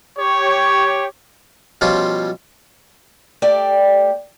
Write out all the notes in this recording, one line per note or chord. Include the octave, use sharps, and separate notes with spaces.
G4 C#5
B2 F3 G3 C#4 F4
A3 G4 D5